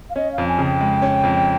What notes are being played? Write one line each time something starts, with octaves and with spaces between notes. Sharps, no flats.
F5
C#4 D#5
F5
F2
G#5
C#3
G5
G#3
C#4
F2